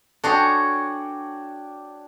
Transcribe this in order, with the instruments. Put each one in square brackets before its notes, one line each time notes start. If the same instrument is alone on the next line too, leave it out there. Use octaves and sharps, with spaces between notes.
[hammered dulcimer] D4 G5 [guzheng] F#4 G#4 C#5 [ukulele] A4